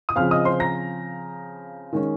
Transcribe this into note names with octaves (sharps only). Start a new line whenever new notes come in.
D#6
C#3 F3 C4 F5 F6
D#5 D#6
C5 C6
A#5 A#6
D#3 G#3 C#4